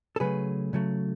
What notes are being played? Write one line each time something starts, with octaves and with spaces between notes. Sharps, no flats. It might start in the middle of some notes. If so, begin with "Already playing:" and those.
A4
C#3 F#3 A3 G#4 B4
C#3 F#3 A3